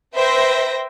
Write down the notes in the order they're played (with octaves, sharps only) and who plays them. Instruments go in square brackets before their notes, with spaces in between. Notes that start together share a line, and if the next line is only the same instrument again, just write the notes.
[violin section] B4 C5 E5 G5 A#6